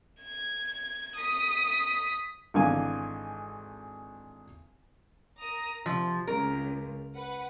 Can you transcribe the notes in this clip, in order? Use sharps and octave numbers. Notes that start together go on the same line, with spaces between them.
G#6
D#6 B6
G#1 D3 E3 F5 G#5
A#4 A#5 D#6
C3 F3
C#2 A#4
B4 F#5